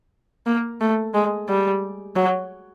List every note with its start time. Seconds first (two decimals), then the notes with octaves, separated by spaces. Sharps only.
0.46 A#3
0.81 A3
1.14 G#3
1.49 G3
2.16 F#3